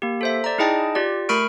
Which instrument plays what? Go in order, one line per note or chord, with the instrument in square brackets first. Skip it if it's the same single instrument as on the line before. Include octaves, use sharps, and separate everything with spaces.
[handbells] A#3 G4
A4 C5 E5
D5 A#5
D#4 E4 G#4 D#5 G5 A5
F4 G4 D5
A3 A#4 B5 C#6 F6 D7